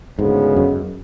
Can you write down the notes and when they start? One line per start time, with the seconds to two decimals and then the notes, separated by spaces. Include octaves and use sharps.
0.18 D2 G#2 C#3 G#3 B3
0.56 F#2